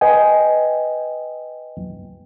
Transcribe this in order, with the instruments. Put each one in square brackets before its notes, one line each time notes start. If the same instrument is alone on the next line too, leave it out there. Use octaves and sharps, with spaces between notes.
[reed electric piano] B4 D#5 G5 G#5